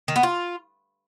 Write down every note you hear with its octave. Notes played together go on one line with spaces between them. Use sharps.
D#3
B3
F4